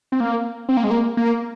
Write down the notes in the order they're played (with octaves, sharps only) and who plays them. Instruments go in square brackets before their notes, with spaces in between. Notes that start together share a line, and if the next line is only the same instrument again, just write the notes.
[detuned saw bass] C4
A#3
C4
A#3
G#3
A#3
A#3